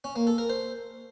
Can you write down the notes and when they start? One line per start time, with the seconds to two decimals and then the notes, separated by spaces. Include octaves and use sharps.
0.04 C#4
0.16 A#3
0.27 A4
0.38 A#4
0.50 C5